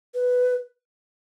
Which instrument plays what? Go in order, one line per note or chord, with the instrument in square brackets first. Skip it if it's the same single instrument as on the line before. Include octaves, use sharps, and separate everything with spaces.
[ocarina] B4